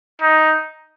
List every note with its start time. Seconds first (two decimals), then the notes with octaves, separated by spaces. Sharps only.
0.22 D#4